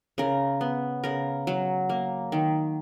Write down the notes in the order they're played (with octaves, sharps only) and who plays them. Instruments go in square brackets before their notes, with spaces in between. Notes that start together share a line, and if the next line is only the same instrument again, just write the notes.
[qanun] C#3 A#4
B3
C#3 A#4
F#3
A#3
D#3